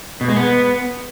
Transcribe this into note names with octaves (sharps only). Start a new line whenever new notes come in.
B2
G#3
B3